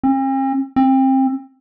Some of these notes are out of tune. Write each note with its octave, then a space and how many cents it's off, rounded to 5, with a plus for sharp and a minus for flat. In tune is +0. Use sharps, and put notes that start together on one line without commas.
C4 +45
C4 +25